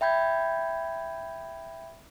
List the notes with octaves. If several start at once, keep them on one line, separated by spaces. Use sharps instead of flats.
E5 G5 B5 G6 G#6